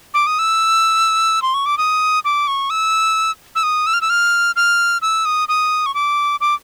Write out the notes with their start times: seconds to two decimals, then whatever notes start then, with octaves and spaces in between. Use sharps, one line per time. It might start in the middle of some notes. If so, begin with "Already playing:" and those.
0.14 D6
0.27 D#6
0.39 E6
1.42 C6
1.54 C#6
1.66 D6
1.78 D#6
2.25 D6
2.48 C#6
2.70 E6
3.56 E6
3.63 D#6
3.86 E6
3.94 F6
4.01 E6
4.10 F6
4.56 F6
5.02 E6
5.25 D#6
5.48 D#6
5.86 C#6
5.94 D6
6.41 D6